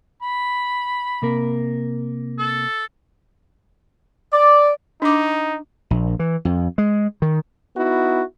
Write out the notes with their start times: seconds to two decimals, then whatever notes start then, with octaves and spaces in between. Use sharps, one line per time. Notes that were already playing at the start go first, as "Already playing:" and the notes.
0.22 B5
1.22 C3 A#3 A#4
2.38 A4
4.33 D5
5.02 D4 D#4 D6
5.90 A#1
6.19 E3
6.45 F2
6.78 G#3
7.22 D#3
7.76 B3 D#4 E4 F#4